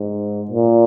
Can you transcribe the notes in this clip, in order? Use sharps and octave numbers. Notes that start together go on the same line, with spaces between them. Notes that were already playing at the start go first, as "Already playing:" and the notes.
Already playing: G#2
A#2